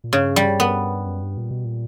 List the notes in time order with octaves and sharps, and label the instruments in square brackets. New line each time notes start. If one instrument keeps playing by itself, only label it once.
[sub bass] A#2
[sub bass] G2 [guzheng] C#3
[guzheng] G3
B3
[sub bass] F#2
G2
A#2
B2
A#2